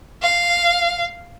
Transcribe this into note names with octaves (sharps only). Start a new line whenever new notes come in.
F5